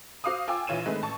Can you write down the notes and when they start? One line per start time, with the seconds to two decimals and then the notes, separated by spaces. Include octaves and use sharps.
0.24 F#4 C5 F5 D6 D#6
0.48 F4 G5 G#5 D6 E6
0.67 A#1 E3 F4 C#5 D#7 E7
0.86 D#3 G#3 A3 C4 B4
1.02 A1 A5 C#6